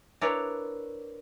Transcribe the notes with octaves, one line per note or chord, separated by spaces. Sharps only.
D4 E4 A#4 B4 C#5 D5